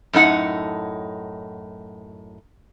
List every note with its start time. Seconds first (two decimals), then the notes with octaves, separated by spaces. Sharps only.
0.13 F#2 A2 D#4 F#5